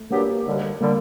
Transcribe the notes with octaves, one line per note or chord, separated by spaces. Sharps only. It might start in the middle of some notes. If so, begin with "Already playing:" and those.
Already playing: A3
A#2 F#3 A#3 B3 D4 G4
D#2 D3 G3
D3 G3 A#3